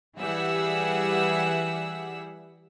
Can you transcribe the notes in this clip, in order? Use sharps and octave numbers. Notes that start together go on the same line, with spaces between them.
E3 G3 G#4 E5 F#5 E6